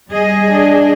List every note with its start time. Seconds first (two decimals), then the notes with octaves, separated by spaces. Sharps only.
0.11 G3 G#4 D#5
0.49 D4